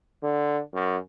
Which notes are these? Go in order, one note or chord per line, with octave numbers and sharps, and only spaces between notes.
D3
F#2